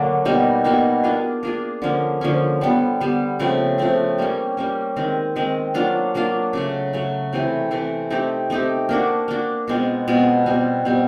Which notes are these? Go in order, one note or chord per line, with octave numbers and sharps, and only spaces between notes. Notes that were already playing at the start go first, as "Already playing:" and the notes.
Already playing: D3 F#3 A#3 D4
B2 G3 A#3 D#4
B2 G3 A#3 D#4
A#3 D4 F4 G#4
A#3 D4 F4 G#4
D3 F3 A#3 C#4
D3 F3 A#3 C#4
D3 G3 B3
D3 G3 B3
C#3 F3 A3 C4
C#3 F3 A3 C4
G3 A#3 C#4
G3 A#3 C#4
D#3 G#3 C4
D#3 G#3 C4
F#3 A#3 D4 F4
F#3 A#3 D4 F4
C#3 F#3 A3
C#3 F#3 A3
C3 E3 A3
C3 E3 A3
A3 C4 D#4 G4
A3 C4 D#4 G4
A#3 D4 F#4
A#3 D4 F#4
B2 G#3 C4 F4
B2 G#3 C4 F4
B2 G3 C4
B2 G3 C4